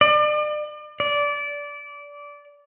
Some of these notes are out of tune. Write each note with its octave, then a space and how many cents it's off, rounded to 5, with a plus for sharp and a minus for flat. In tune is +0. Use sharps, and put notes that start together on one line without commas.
D5 +40
D5 -20